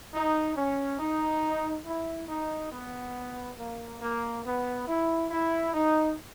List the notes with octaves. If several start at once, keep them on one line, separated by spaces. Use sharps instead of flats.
D#4
C#4
D#4
E4
D#4
B3
A#3
A#3
B3
E4
E4
D#4